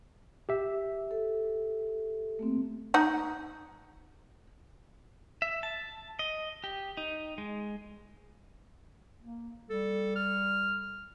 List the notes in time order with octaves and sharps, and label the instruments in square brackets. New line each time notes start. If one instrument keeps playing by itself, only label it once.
[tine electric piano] G4 E5
[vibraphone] A4
A3 A#3 C4
[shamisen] D#4 F#5
[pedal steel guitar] E5
A5
D#5
G4
D#4
G#3
[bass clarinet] A#3
[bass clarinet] G3 [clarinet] A4
[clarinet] F6